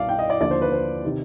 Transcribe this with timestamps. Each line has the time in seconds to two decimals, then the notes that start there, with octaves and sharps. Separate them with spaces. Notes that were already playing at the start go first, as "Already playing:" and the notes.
Already playing: C2 B2 D5 F5
0.09 G5
0.19 D#5
0.30 D5
0.40 D#2 D3 F3 D5
0.51 C5
0.62 B4
0.72 C5
1.05 C3 D#3